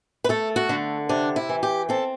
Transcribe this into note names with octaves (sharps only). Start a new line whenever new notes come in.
B4
A3 A4
F#4
D3
C3 D4
E4
E3
G4
C4 A4